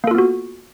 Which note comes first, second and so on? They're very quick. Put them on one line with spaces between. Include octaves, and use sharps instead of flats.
A#3 A4 F4 B3 F#4